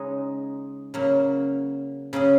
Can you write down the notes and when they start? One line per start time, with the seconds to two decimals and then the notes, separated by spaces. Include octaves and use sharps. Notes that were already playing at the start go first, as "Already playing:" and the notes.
Already playing: C#3 G#3 D#4 G#4
0.94 C#3 F#3 A#3
2.13 C#3 F#3 C#4 G#4